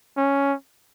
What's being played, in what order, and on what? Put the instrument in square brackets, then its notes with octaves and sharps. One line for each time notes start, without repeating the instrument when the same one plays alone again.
[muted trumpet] C#4